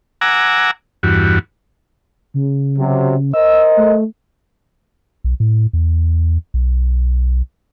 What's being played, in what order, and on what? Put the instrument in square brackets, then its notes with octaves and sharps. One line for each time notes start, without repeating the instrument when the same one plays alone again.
[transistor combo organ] F#5 G#5 A#5 D6 E6
E2 G2 F#4
[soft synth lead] C#3
[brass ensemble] C3 F#3
[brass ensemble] A#4 C5 D#5 [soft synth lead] E6
[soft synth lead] A3
[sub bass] B1
A2
E2
B1